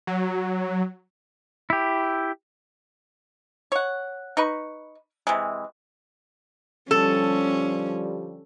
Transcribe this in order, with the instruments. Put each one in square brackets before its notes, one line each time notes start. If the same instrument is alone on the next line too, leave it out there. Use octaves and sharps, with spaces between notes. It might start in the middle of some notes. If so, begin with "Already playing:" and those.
[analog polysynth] F#3
[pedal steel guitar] E4 G4
[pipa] C#5 F#5
D#4 B4 C#6
C3 E3 G#3
[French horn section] D3 F3 G3 [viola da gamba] C#4 [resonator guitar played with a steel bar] A4